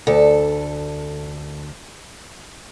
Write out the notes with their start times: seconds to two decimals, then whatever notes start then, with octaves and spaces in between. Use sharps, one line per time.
0.07 D2 A4